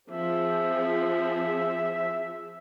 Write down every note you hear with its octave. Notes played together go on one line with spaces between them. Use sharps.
F3 C4 G#4 E5